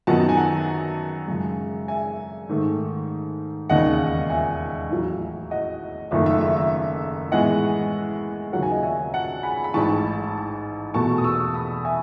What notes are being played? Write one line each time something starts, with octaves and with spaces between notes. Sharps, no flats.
F#2 D#3 F#3 B3 D#4 F#5 A5
G#5
F#5 A5
F#2 C#3 G#3
E5 G#5
G#2 D#3 A3
E1 D#2 C#3 D#5 F#5
E5 G#5
A1 A2 F#3
D#5 F#5
F#1 F#2 D#3 A3 E5
E5
E5
E5
A2 E3 G#3 B3 E4 D#5 F#5
D#2 C#3 F#3 C#4 F#5
G#5
D#5 F#5
E5 G#5
F#5 A5
G#5 B5
B5
A1 G#2 E3 A5 C#6
E2 B2 A3 A5 C#6
D#6
C#6 E6
B5 D#6
E5 G#5